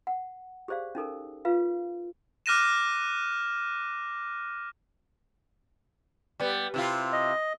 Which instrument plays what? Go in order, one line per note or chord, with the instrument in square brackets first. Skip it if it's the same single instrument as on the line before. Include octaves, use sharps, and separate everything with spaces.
[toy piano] F#5
G4 G#4 C5 D5 F5
C#4 D#4 A4 A#4
F4 B4 F5
[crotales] D6 F6 F#6 A#6 D#7 E7
[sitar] G3 B3
C3 E4 F4
[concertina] D#5